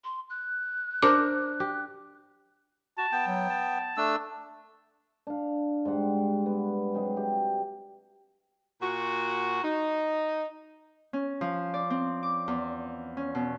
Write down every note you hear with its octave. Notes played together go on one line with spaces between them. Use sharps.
C6
F#6
D4 A#4 C5 D6
G4
F#4 A5
B3 G5
F#3
A5
A3 D4 E6
D4 F5
G#2 G3 F#5 C6
B3
C3 F#3 G#3 G#4
G4
A#2 F#4
D#4
C#4
F3
D5
C4
D6
E2
C#4
B2